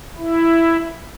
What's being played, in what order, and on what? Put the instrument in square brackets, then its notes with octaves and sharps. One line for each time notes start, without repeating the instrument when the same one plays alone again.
[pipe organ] E4